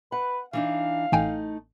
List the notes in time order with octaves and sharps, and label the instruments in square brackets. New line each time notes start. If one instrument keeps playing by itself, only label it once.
[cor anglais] B4 [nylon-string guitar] F#5
[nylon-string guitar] E3 D4 D#4 [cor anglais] F5
[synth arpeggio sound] A1 G5 G#5 [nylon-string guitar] A3 D#4